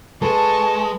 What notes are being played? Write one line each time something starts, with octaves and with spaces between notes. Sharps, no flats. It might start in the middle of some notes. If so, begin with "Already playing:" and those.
G#3 A4 B4 G#5 A5 C#6